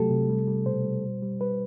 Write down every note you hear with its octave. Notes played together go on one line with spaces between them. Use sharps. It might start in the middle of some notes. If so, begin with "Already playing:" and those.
Already playing: C3 F#3 A3 G4 A4
C3
G3
G3
B2 C5
G3
B2
G3
G3 B4